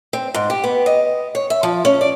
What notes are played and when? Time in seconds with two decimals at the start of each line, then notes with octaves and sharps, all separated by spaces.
0.13 C4
0.34 G#2
0.50 G4
0.64 B3
0.86 D#5
1.35 C#5
1.50 E5
1.63 F3
1.85 C#4
2.01 D5